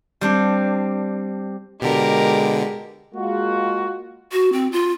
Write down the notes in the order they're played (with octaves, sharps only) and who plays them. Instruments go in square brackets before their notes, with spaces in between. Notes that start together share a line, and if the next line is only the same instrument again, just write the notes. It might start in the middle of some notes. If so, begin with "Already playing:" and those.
[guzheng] G3 C4 D4
[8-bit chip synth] B2 D3 [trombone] G#3 [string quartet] G4 A#4
[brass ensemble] G#3 A#3 F4 F#4
[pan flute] F#4
C4
F4